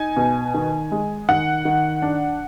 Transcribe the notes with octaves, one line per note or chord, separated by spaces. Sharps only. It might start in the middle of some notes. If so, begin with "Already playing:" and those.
Already playing: D#4 G#5
B2
D#3
G#3
D#3 F#5
D#3
D4